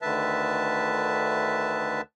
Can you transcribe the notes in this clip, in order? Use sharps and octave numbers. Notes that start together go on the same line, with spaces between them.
D2 D3 D#3 B4 E5 A5